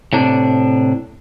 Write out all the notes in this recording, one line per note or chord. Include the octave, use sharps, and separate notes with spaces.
A2 C3 D4